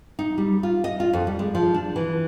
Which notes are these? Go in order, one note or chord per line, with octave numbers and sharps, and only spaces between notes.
D#4
G3
F4
D#5
F4
F2
G3
G#3
F3
D4
E3